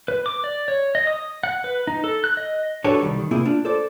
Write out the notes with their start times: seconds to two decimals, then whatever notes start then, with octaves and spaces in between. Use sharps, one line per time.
0.08 B4
0.26 D6
0.44 D5
0.68 C#5
0.95 D#5
1.07 D#6
1.43 F#5
1.64 B4
1.87 D#4
2.04 A4
2.24 F#6
2.37 D#5
2.84 D4 F#4 G4 A4 B4 C#5
3.01 C2 F#2 D#3 G3
3.19 D#3
3.31 C3 A#3 C4 E4 F4 G#4
3.45 D4 F4
3.65 A4 C5 D5